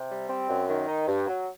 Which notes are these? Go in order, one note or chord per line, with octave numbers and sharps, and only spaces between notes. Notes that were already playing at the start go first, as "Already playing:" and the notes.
Already playing: C3
G3
C4
F#2
D#3
D#4
G2
F#3